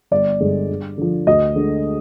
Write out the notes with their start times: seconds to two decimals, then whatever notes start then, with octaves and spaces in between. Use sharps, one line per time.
0.11 G1 D5
0.40 G2 D3 G#3
0.69 G2
0.98 D3 F3
1.27 D2 D#5
1.56 D3 G#3